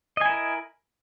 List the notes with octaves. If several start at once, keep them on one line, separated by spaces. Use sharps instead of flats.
E4 A#4 D#5 G#5